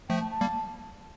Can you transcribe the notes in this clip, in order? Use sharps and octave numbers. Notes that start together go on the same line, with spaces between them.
F3 A3 G5
A5
A5
G3 A#3